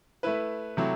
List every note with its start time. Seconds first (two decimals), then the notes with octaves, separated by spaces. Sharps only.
0.23 A3 E4 B4
0.77 C3 F#3 A3 E4